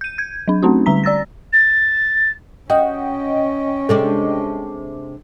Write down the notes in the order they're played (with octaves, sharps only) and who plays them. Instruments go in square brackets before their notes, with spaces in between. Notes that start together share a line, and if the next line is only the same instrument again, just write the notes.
[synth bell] G6 D#7
G6 G#6
F#3 D4
A3 C4 C#4 D#4 F#4
D3 G3 A#5 B6
D5 E6 A6 A#6
[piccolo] A6
[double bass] C#4 [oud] F#4 [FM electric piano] D#5 G5
[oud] C3 G#3 D4 [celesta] A4